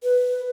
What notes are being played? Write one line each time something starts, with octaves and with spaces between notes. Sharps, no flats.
B4